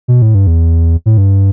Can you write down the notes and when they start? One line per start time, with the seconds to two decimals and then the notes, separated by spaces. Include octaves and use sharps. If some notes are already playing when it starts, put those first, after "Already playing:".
0.08 B2
0.22 A2
0.35 G2
0.47 E2
1.06 A2
1.18 G2